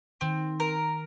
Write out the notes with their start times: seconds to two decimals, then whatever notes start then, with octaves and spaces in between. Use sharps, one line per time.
0.21 D#3 C4
0.60 A#4